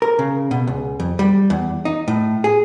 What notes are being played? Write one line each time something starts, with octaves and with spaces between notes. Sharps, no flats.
A#4
C#3
B2
C#2
F2
G3
E2
D#4
A2
G#4